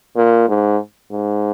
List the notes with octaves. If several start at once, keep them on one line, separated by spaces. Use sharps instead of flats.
A#2
G#2
G#2